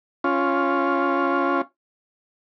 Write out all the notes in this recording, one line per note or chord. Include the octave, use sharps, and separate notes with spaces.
C#4 F4